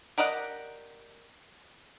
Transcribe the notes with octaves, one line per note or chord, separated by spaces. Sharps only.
G4 A#4 D5 D#5 F#5